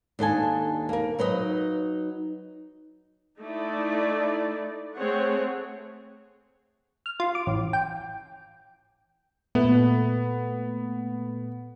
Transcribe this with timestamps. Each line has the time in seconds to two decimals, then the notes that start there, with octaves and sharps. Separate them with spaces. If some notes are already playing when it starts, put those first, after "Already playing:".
0.19 D#2 D4 A4 D#5 G#5
0.89 A#3 A#4
1.19 F#3 D#4 B4 D#5
3.40 A3 D#4 E4 D5
4.97 A3 C4 G#4 C#5 F#5
7.06 F6
7.20 F4
7.35 D6
7.47 A1
7.73 G5
9.55 A#2 A3 B3